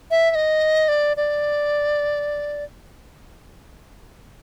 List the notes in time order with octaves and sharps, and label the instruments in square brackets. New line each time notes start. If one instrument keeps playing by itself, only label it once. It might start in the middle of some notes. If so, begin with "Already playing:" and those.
[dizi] E5
E5
D#5
D5
D5